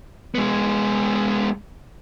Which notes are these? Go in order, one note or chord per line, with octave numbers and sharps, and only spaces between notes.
G#3 B3